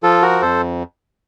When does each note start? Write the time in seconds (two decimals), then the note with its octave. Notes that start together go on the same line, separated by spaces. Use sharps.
0.03 F3 F4 A4
0.22 F#4 A#4
0.42 F2 A4 C5